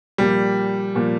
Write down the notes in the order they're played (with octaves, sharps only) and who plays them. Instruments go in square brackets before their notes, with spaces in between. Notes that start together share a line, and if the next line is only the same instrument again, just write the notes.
[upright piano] A#2 F3 A#3 [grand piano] G3
[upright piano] A#2 F3 A#3